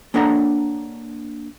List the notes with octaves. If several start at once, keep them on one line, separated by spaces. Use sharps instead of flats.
A#3 D4 A4 C#5 F#5 A#5